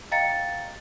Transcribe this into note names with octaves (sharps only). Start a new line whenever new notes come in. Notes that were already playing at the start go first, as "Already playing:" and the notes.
D#5 F5 G5 A#5 A6 C#7